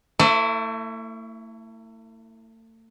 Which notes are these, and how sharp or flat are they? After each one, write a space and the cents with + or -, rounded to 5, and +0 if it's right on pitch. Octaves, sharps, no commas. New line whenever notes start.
A3 +40 E4 +0 C5 -20